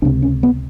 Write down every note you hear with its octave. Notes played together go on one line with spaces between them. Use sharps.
C#2 C3 D4
C#4
B3